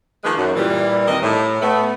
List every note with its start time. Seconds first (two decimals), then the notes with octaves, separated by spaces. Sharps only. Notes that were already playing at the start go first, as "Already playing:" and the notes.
0.24 D#3 F3 G#3 A#3 G#4 B4
0.36 F#2
0.55 A#2 E3 G3
1.07 D#2 C4 A#4 D#5
1.22 A2
1.62 A3 B3